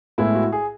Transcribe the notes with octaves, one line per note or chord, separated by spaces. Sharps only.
A2 G#3 B3 E4
F#4
G#4